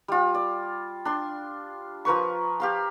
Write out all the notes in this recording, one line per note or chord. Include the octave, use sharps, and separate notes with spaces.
G3 F4
D5
D4 C6
F3 A#4 B4 C#6
G4 F5 C6